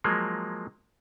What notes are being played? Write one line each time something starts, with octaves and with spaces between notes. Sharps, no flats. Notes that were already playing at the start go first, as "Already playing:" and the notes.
F3 F#3 G#3 A#3